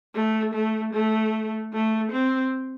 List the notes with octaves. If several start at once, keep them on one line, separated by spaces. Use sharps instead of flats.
A3
A3
A3
A3
C4